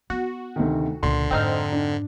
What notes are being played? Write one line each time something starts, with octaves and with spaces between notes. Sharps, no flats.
B3 F#4
D2 C3 D#3
C#2 A#2 D3 C6
F2 G#2 C4 D#4 F6
D4